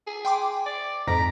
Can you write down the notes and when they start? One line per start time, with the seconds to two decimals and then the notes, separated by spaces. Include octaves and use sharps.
0.07 G#4
0.25 G5 C6 D6
0.66 D5
1.07 F2 G#2 A#5 B6